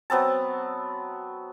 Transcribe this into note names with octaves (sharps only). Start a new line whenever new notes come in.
F#3 B3 C4 A5